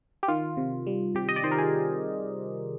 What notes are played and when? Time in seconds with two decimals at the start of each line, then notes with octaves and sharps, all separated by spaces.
0.23 G4
0.28 D#3 F4
0.57 C3
0.87 G3
1.15 C3 G4
1.29 D#5
1.36 D5
1.43 D#3 C5
1.51 A#4
1.58 G#4